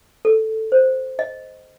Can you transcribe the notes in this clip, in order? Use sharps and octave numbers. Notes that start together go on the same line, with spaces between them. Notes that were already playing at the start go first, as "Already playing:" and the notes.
A4
C5
D#5